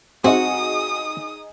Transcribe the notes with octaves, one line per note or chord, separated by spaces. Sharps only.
C4 D#4 F#4 G#4 D#6